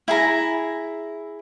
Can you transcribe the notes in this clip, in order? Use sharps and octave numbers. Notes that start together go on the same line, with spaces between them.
E4 G#4 A#5